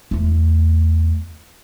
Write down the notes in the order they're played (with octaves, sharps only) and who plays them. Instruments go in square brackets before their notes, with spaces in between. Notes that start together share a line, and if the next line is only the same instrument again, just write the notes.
[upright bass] E2 A3